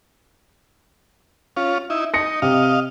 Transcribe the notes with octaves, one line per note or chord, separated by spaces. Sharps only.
C#4 F4
D#4 E4
D#4 A#6 C#7
C3 D#5 F5